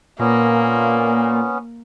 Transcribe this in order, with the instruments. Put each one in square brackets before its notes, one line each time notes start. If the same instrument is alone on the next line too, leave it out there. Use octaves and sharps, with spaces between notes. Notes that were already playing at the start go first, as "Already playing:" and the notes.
[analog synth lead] A#2 [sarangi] A#3 [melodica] B3 C#4